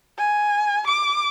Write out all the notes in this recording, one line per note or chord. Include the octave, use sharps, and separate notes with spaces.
G#5
D6